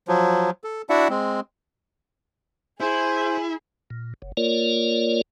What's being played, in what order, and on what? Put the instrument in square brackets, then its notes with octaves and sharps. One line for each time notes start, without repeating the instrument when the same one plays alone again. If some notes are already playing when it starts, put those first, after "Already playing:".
[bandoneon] F3 F#3
A4
D4 E4 F#4 D5 E5 F#5
G#3 C4
[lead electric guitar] E4 [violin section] G#4 [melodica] C5 [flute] G#5
[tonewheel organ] A#2
F#1
A#3 F4 A#4 C#5 D5